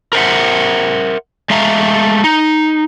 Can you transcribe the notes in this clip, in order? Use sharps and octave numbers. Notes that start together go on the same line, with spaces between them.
A#4 C5 E5 F#5
G#3 A3 E5 F5 A#5
D#4